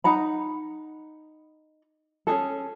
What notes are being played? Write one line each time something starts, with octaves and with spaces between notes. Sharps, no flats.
D#4 F#5 A#5 B5
C#4 D#4 G#4 A4